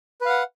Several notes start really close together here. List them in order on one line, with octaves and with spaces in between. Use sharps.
B4 F5 F#5